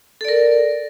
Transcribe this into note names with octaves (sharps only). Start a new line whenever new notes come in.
A4 A#4 D5